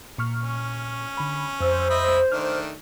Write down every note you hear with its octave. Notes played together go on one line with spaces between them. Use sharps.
A#2 C#6 F6
C#4
D3 B5
F2 C5 E6
D#5 E5 B5
D#3 A3 D4 F6